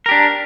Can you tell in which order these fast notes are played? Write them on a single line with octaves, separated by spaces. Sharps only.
A#4 G4 D4